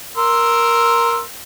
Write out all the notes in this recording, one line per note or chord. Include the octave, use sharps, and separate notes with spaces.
A#4 C6 E6